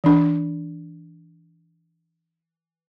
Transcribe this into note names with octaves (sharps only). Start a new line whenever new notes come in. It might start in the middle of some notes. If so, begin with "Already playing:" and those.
E3 D4